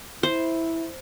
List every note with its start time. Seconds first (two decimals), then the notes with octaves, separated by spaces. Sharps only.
0.23 E4 C5